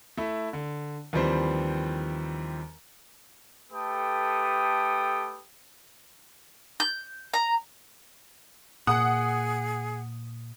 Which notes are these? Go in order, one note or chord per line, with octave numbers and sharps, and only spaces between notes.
A3 E4
D3
D#2 E3 F3 G3 C4 C5
A3 G4 A4 B4 G5 D#6
G6
A#5
A#2 G#4 F#5 D#6